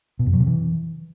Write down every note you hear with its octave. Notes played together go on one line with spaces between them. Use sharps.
B2
F#2
F#3
C3
E3